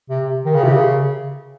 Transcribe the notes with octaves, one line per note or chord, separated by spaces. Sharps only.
C3
D#3
C#3
C3
C#3